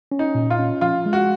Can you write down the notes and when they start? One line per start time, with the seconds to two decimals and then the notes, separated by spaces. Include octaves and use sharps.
0.12 C#4
0.19 D#4
0.35 A#2
0.50 F4
0.59 C#4
0.81 F3 F4
1.06 G#3
1.13 F#4